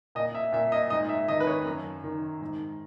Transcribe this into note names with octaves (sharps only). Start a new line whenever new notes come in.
A#2 D#5
E5
A#2 E5
D#5
G#2 D#5
E5
D#3 D#5
B4
C#5
F#2
D#3
G#2